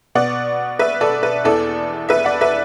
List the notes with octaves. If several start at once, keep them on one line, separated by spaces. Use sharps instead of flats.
B2 B3 D5 F#5
B4 E5
A4 D5
B4
E2 E3 B3 A4 D5
B4 E5
D5 F#5
B4 E5